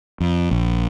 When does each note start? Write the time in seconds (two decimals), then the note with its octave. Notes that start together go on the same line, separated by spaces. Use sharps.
0.20 F2
0.51 A#1